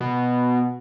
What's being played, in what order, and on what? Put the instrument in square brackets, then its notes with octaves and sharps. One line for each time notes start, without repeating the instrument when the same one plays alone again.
[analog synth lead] B2